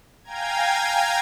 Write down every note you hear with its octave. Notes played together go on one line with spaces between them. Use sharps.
F5 G5 G#5 A#5 G#6